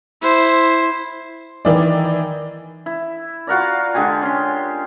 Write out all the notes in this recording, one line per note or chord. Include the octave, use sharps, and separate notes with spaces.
E4 C5
D#3 E3 D5
E4
F4 F#4 A#4 D5
D3 G#3 G4 G#5
C#4 C6